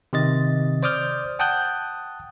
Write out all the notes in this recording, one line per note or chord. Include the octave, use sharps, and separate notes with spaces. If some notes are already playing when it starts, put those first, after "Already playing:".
C3 D#3 D#5 A6
C5 D5 D6 D#6 F6 G6
F#5 G5 A5 D#6 F#6 G6